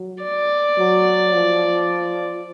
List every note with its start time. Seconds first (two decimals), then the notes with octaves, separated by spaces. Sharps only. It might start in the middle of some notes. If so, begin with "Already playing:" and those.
Already playing: F#3
0.23 D5
0.78 F#3
1.35 F3